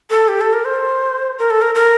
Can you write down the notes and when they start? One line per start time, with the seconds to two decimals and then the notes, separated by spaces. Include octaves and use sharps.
0.10 A4
0.28 G4
0.41 A4
0.53 A#4
0.65 C5
1.39 A#4
1.50 A4
1.62 A#4
1.75 A#4